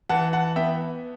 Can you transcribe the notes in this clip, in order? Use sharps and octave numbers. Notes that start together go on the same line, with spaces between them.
E3 F#5 A5
F#5 A5
B3 E5 G5